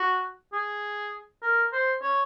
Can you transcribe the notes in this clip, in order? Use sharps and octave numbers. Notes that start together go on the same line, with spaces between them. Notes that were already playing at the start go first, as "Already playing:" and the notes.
Already playing: F#4
G#4
A#4
C5
C#5